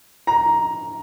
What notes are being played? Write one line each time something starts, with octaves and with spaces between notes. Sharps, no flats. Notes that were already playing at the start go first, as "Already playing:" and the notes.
A#5